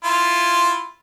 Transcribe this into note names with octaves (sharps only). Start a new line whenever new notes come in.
E4 F4